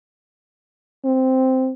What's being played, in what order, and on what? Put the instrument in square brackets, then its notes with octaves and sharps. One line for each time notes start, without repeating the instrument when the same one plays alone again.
[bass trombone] C4